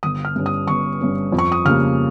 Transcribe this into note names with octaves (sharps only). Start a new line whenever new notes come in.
G1 D#6
F6
G2 G3 C#4
D#6
G1 C#6
G2 G3 C#4
F2
C#6
D#6
C#3 G3 A#3 F6